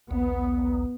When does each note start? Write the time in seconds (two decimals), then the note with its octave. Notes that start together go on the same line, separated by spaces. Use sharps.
0.11 A#1 D#2 B3